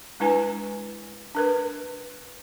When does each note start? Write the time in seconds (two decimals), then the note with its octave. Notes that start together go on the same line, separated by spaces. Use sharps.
0.20 G#3 D4 E4 B4 G#5 A#5
1.35 D4 A#4 B4